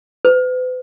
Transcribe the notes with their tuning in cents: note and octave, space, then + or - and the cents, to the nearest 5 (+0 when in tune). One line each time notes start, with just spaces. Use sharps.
B4 +45